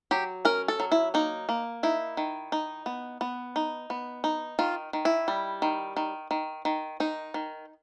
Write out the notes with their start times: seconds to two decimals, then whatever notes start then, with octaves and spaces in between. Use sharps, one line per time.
0.11 F#3 G4
0.45 C#4 A#4
0.68 A4
0.80 F#3
0.92 E4
1.14 A#3 D#4
1.49 A#3
1.83 D#4 E4
2.17 D#3
2.52 D#4
2.86 B3
3.21 B3
3.56 D#4
3.90 B3
4.24 D#4
4.59 D#3 F4
4.93 D#3
5.05 E4
5.28 G3
5.62 D#3
5.97 D#3
6.31 D#3
6.65 D#3
7.00 D#3 D#4
7.34 D#3